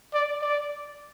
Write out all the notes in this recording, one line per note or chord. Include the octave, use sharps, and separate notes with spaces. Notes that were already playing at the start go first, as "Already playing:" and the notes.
D5
D5